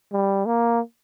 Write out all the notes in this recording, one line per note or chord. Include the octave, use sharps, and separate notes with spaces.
G3
A#3